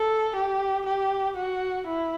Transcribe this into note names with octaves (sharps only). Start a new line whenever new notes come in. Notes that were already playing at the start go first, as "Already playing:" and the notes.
Already playing: A4
G4
G4
F#4
E4